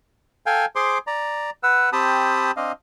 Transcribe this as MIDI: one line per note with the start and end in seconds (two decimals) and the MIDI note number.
0.46 0.65 69
0.46 0.65 77
0.46 0.65 79
0.46 0.65 80
0.76 0.98 68
0.76 0.98 72
0.76 0.98 84
0.76 0.98 86
1.07 1.50 74
1.07 1.50 82
1.63 1.90 71
1.63 1.90 78
1.63 1.90 88
1.93 2.51 60
1.93 2.51 67
1.93 2.51 81
1.93 2.51 83
1.93 2.51 87
2.57 2.72 60
2.57 2.72 62
2.57 2.72 75
2.57 2.72 77